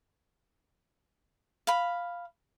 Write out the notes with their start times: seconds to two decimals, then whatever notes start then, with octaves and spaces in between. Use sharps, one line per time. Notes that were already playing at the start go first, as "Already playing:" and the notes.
1.67 F5 B5